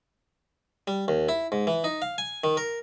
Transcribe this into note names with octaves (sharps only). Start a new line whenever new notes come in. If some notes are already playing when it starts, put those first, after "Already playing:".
G3
D#2
E4
G#2
E3
D#4
F5
G#5
D#3
A#4